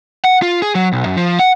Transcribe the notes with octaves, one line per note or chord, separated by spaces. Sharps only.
F#5
F4
G#4
F#3
B1
F#2
F3
F#5